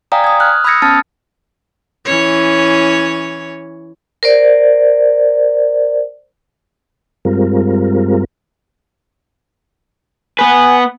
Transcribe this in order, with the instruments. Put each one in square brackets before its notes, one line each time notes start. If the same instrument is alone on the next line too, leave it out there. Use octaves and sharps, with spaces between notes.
[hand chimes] D5 F5 G5 G#5 A#5 D#6
D#6 G#6
F6 F#6
B5 D#6 E6 G#6 A#6 C#7
B3 C#4 A5 F6 A6
[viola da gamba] E3 C#4 C#5
[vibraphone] A#4 C5 D5
[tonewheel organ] G2 G3 G#3 C4 F4 A#4
[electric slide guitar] B3 B4 [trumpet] G#5